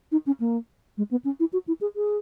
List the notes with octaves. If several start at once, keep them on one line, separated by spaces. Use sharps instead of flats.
D#4
C#4
A#3
G#3
B3
C#4
E4
F#4
E4
G#4
G#4